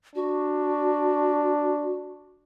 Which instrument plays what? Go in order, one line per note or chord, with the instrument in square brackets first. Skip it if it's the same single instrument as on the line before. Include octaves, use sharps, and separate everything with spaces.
[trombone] D4 [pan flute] F#4